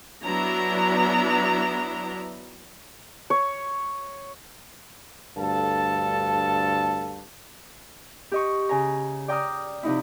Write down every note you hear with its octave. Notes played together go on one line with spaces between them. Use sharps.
F#3 B3 D4 E4 A#5
C#5
D2 G2 A4 F5 A5
G4 D#5 C#6
C#3 G#5 A#5
D5 G5 A#5 D6 D#6 F6
C3 F3 D#4 E4